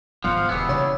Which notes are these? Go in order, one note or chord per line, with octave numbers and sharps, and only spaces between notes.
G#1 F3 G3 B3 C5 F5 F#5
D#1 F2 C#3 G3 B3 E4 G#4
F#1 C#3 E3 C#5